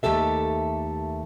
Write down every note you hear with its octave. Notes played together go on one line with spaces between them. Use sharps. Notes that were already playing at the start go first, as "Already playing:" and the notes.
D#2 A3 G4 A4 E5